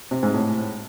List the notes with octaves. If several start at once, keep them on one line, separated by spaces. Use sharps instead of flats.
C3
G#2
A2